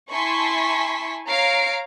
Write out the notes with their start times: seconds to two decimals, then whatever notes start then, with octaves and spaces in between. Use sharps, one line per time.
0.12 E4 G#5 A5 C6 C#6 B6
1.28 C#5 F5 A#5 C7 D7